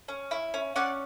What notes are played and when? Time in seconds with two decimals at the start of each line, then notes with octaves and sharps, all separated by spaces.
0.08 C#4
0.31 E4
0.54 C#4
0.76 C#4 D5 F#5